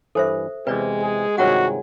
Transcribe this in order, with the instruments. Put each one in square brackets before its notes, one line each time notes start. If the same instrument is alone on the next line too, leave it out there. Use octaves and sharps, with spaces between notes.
[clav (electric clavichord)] G2 E3 [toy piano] A4 C5 E5
[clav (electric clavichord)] E2 C3 [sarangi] G#3 [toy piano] B4 D5
[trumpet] G#4
[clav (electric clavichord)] G2 C3 D#3 [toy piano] F4 C#5 F#5 [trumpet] F#4